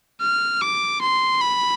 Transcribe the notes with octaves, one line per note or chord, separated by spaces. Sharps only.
F6
D6
C6
B5